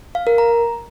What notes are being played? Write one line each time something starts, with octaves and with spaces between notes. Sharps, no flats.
F5
A#4
A#5